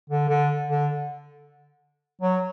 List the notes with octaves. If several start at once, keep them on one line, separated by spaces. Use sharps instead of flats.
D3
D3
D3
F#3